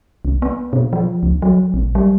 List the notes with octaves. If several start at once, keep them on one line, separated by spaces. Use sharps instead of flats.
C2
B3
B2
F3
C#2
F#3
A#1
G3